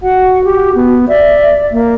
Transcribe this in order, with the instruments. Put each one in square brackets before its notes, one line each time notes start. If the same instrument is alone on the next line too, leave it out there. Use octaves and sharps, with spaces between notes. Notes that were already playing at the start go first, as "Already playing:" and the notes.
[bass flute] F#4 [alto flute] F#5
[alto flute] G4
B3
[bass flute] D5 [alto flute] E5
[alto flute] A#3